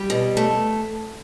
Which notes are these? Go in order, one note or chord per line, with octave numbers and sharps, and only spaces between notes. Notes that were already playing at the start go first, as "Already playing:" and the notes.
Already playing: G3
B2
A3